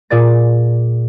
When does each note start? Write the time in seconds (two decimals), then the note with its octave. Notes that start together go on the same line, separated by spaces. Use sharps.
0.10 A#2 G#4 D5 A6